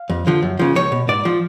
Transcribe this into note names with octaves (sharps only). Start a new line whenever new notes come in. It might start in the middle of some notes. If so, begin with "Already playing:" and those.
Already playing: F5
F2
D3 F3
F#2
C#3 F3
C#2 C#5
B2
G#2 D5
F3